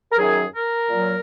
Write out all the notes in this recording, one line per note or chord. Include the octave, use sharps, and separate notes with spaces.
A#4
F#2 D#3 F#3 G#4
A#4
A#2 F#3